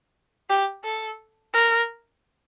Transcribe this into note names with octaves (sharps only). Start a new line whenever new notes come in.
G4
A4
A#4